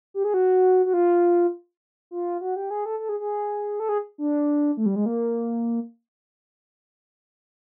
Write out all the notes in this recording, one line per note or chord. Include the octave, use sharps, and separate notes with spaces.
G4
G#4
F#4
F#4
F4
F4
F#4
G4
G#4
A4
A4
G#4
G#4
A4
G#4
D4
A3
G3
G#3
A#3